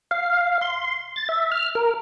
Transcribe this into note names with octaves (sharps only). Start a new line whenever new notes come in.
F5
C6
A6
E5
F6
A#4